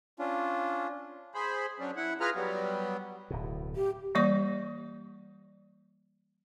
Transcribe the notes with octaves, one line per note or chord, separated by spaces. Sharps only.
C#4 D4 F4
G#4 C5 B5
F#3 C#4 D4
E4 F#5
F4 G#4 B4 A#5 F6
F#3 G3 B3
D1 B2
G4
E3 G3 A#3 D5 C#6